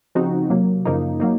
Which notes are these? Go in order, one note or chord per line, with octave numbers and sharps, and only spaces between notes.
C#3 F3 C4 D#4 F#4
C3 F#3 A#3
F#2 C#3 F3 A#3 D#4
F#3 A#3 D#4